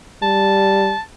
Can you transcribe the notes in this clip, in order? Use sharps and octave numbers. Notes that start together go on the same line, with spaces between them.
G3 A5